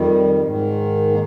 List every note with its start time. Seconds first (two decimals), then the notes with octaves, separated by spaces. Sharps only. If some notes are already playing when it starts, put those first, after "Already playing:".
Already playing: F2 D#3 G3
0.43 G#2 D#3
1.11 A#3